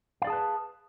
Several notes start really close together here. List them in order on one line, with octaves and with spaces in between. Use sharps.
F5 D5 G#4 A5 B4